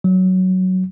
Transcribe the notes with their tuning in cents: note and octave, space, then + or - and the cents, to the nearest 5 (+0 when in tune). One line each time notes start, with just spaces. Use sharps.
F#3 +5